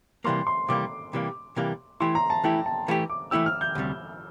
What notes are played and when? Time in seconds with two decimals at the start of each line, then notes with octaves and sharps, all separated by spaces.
0.24 C3 E3 G3 A#3 C6
0.47 C6
0.68 C3 E3 G3 A#3 D6
1.13 C3 E3 G3 A#3
1.56 C3 E3 G3 A#3
2.00 E3 A3 E4 G4 C6
2.15 A#5
2.30 A5
2.44 E3 A3 E4 G4 G5
2.66 A5
2.88 E3 A3 E4 G4
3.10 D6
3.31 E3 A3 E4 G4 E6
3.46 F6
3.61 G6
3.75 D2 C3 G3